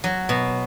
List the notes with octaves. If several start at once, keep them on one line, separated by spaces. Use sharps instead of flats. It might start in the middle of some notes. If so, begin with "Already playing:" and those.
F#3
B2